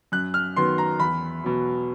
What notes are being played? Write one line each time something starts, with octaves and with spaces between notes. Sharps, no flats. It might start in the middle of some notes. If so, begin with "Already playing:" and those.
F#2 F#6
F6
D#3 F#3 B3 C6
A#5
E2 B5
B2 F#3